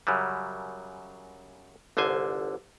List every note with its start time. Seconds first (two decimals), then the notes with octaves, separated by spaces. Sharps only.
0.07 F#2 C#3 F#3 G3
1.97 G1 C2 D3 C5 G#5